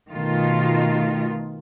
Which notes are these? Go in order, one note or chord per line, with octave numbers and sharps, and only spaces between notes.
B2 D#3 A3 F4